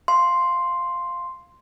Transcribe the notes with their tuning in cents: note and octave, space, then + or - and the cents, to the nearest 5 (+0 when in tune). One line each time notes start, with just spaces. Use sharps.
F5 +0 C6 +0